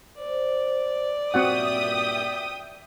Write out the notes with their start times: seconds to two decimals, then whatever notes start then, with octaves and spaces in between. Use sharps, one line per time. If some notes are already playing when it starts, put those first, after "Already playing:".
0.19 C5 D5
1.34 G2 A#2 C4 F#4 E5 F#5 G5 D#6